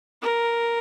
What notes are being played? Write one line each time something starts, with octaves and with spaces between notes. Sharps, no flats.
A#4